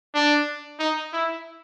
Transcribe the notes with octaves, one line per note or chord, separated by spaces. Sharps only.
D4
D#4
E4